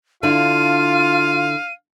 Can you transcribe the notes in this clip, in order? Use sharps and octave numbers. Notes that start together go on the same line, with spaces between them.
D3 D4 E4 F4 F5 D#7